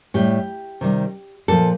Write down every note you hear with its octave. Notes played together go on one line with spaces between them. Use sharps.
A2 G3 G4
C3 D#3 G3
A#2 F3 A4